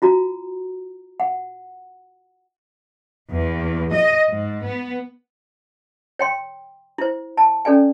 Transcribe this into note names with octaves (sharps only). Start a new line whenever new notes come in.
F4 F#4 A#5
F#5
E2
D#5
G#2
B3
C#5 G5 C6
E4 C5
A5
C#4 A4 D5 G#5